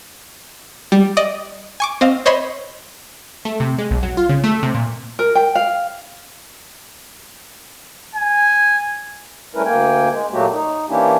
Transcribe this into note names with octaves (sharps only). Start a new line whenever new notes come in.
G3
D5 D#5 D#6 A#6
G#5 C#6 D6
C4 D#5 F5
C5 C#5 D#5 B5 C6
A3
C3
G#3
B1
F#3
F4
C#3
A3
C3
A#2
A#4
G5
F5
G#5
G3 A3 C#4 E4 A#4 B4
D2 A#3 G5 G#5
G#3
A#2 F#3 A3 A#3 F#4 G4
D#4
E3 A#3 C#4 D4 E4 G4